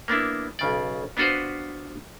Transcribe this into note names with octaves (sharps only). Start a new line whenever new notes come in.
A#3 B3 D4 E4
B1 C#3 D5
B3 D4 F4 F#4 B4 C5